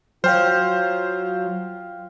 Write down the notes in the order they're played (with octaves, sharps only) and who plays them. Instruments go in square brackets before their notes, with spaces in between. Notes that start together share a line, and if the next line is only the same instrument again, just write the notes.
[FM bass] F#3 [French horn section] F4 [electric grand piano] C5 [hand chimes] F5 G5 F6